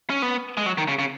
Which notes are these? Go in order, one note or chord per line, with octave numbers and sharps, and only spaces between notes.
C#4
B3
G#3
F#3
D#3
C#3
C#3